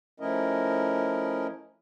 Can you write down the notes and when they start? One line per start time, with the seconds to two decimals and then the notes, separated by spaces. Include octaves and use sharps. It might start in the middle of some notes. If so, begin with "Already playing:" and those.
0.20 F3 A3 C#4 E4 A#4 D#5